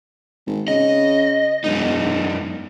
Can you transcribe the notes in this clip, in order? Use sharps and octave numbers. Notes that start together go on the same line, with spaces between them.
G#1
C#3 D#5
E1 F#2 D#4